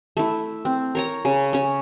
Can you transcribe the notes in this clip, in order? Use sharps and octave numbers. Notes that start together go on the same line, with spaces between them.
A3 E4
C4
A#4 C#5 A#5
C#3
C#4 C#5